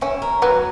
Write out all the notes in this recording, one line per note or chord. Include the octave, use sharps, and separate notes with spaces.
C#4 E4
A#4
F#3 B3